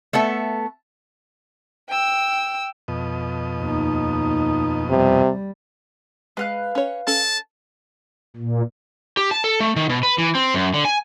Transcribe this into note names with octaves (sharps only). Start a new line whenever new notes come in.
A3 B3 A4 E5
G5 E6
F2 B2 D#5
D#2 D#4
C3 G3
G#3 B4 F5 F#6
C#4 C#5
C#4 A4 A5
A#2
G4
A5
A4
A3
D#3
B2
B4
E3
C4
F#2
D3
G#5